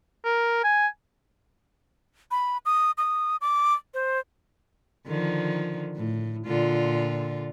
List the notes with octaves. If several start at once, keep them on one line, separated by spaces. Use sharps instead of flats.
A#4
G#5
B5
D#6
D#6
D6
C5
D3 D#3 F3
A2
A#2 D3 F4